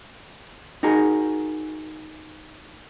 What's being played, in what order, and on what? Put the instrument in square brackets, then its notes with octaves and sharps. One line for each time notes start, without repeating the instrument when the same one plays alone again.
[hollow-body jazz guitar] D#4 F#4 G#4 A#4